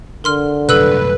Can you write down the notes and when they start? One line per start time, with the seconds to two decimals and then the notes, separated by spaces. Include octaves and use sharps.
0.24 D3 A#4 C6 F6
0.69 C2 F#2 A4 B4 E6 F#6